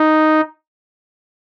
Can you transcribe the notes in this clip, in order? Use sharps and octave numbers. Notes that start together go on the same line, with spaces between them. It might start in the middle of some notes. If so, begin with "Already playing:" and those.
Already playing: D#4